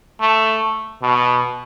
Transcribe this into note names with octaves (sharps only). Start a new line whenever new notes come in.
A3
B2